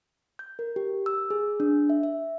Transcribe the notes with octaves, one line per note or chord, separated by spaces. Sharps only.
G6
A#4
G4
E6
G#4
D4
E5
E5